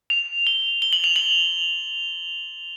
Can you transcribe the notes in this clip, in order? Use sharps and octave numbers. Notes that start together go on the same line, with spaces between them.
F7
G7
G7
F#7
F7
F#7